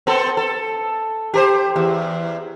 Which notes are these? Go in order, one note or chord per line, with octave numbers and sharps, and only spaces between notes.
B3 C4 A4
A4
G4 A#4 C5
E2